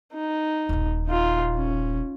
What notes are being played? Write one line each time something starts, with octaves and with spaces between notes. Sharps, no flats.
D#4
D#1 A#1
D#4 F4
C#4